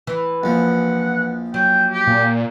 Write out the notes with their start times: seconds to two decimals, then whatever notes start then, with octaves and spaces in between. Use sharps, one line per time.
0.07 E3
0.43 A#1 F3 F#5
1.54 F#3 G5
1.91 G4
2.07 A#2